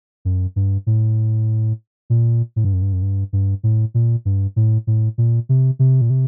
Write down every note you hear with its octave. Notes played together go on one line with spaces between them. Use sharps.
F#2
G2
A2
A#2
A2
G2
F#2
G2
F#2
G2
G2
A2
A#2
G2
A2
A2
A#2
C3
C3
A#2
C3